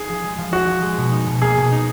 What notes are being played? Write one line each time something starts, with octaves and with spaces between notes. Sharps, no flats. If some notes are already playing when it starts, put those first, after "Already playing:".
Already playing: D#4 G#4
F3
G#3
F3
D#4 F#4
F3
G#3
B2
D#4
B2
A#3 G#4
B2
D#4